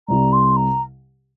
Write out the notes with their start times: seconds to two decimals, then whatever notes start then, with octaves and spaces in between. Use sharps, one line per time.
0.08 C2 C3 G3 A#5
0.32 C6
0.56 A#5